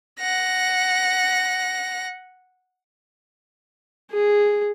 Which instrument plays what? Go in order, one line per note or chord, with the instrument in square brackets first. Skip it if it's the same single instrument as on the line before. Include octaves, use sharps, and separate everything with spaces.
[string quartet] F#5 A#6
[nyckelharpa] G#4